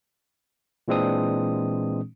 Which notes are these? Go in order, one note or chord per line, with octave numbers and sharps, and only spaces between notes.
A#2 E3 G#3 C4 D4 D#6